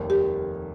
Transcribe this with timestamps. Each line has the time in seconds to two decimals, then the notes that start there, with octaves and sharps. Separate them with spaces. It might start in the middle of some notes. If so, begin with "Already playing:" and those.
Already playing: F1 D#2 D#3 G3
0.10 G4